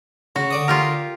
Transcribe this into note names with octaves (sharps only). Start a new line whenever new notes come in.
C#3 F#4
D3 D5 D#6
F4 G4 A#4